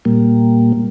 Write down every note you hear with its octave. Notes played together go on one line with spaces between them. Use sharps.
A#2 G3 A#3